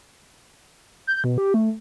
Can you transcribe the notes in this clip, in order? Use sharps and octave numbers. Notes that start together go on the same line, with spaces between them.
G6
B2
G4
A3